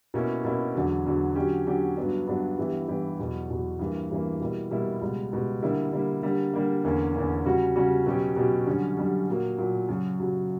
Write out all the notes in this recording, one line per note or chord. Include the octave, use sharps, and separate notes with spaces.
B2 A#3 C#4 E4
B2 A#3 C#4 E4
E2 D3 F#3
E2 D3 F#3
D3 F#3 C#4 G4
D3 F#3 C#4 G4
G2 F#3 B3 D4
G2 F#3 B3 D4
G2 E3 B3 E4 G4
G2 E3 B3 E4 G4
E2 B2 F#3
E2 B2 F#3
G2 E3 A#3
G2 E3 A#3
B2 G3 A#3 E4
B2 G3 A#3 E4
C#2 B2 G3
C#2 B2 G3
D3 G3 A#3 E4
D3 G3 A#3 E4
D3 G3 A#3
D3 G3 A#3
E2 D3 A#3 C#4
E2 D3 A#3 C#4
C#3 G3 C#4 F#4
C#3 G3 C#4 F#4
B2 F#3 C#4 G4
B2 F#3 C#4 G4
F#2 D3 G3 C#4
F#2 D3 G3 C#4
A#2 F#3 A#3
A#2 F#3 A#3
F#2 C#3 F#3
F#2 C#3 F#3